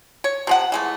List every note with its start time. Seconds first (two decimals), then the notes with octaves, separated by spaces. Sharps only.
0.24 C#5
0.47 C3 F3 F#5
0.72 E3 G#3 A3